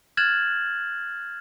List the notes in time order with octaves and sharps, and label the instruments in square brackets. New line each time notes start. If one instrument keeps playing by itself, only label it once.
[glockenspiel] F6 F#6 G#6 A6 E7 F#7